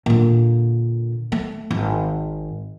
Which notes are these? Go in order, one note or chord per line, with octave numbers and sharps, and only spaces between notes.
A#2 D3
A3
G#1